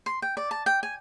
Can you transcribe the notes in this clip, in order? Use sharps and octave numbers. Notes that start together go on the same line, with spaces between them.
C6
G5
D5
A5
G5
G#5